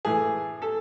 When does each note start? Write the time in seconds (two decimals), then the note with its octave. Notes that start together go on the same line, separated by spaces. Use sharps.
0.05 A2 E3 A3 G#4
0.62 A4